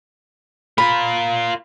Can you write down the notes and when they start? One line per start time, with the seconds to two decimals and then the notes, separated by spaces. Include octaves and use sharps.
0.78 F4 A#4 B5